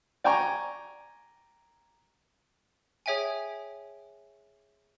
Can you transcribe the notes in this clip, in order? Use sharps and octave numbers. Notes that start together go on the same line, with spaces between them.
D5 G5 G#5 A#5 C#6
G#4 C#5 E5 G5 G#5